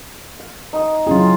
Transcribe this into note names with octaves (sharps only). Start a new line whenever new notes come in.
F5
D#4 D#6
F#3 C#4 E4 F4 G#4